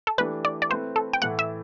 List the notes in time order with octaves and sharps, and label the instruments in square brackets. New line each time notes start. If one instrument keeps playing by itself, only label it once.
[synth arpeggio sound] A4
[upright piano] E3 A3 D4 G4 [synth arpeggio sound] B4
[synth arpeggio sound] D5
D5
[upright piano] A3 C4 E4 B4 [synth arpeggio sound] C5
[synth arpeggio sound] A4
G5
[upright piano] A2 E3 A3 E4 [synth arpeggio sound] F#5
[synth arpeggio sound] E5